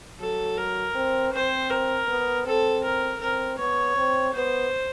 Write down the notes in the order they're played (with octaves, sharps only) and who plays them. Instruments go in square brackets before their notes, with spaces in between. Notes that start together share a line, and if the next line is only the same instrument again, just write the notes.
[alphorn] F#3 [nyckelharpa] A4
[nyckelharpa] A#4
[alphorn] C4
[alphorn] C4 [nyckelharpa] C5
[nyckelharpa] A#4
[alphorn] B3
[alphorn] C4 [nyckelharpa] A4
[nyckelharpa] A#4
[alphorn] C4 [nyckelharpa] A#4
[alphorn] B3 [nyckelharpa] C#5
[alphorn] C4
[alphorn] B3 [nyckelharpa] C5